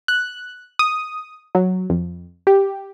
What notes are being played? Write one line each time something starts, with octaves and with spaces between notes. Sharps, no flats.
F#6
D#6
F#3
F2
G4